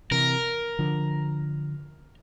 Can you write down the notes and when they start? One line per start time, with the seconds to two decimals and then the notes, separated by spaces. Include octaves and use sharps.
0.11 C3 E3 A#4
0.79 D3 F3